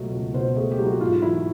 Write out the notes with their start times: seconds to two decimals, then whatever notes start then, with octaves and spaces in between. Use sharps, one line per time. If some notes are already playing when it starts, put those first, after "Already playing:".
Already playing: C#2 B2 F#3 A3
0.13 C#2
0.34 B2 C5
0.56 A3 G#4
0.71 G4
0.78 F#3
0.86 F#4
1.01 G#2 F4
1.22 E3 E4